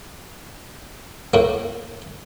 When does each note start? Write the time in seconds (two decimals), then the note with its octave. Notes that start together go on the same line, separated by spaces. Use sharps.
1.34 A2 A#3